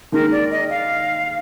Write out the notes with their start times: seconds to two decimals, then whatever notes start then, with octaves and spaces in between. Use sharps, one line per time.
0.12 D#2 D#3 G#3 A#4
0.32 D5
0.51 D#5
0.70 F5